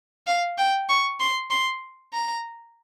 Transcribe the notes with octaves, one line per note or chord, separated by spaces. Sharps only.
F5
G5
C#6
C6
C6
A#5